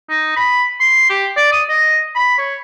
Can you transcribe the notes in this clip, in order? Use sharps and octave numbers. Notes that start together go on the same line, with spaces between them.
D#4
B5
C6
G4
D5
D#6
D#5
B5
C#5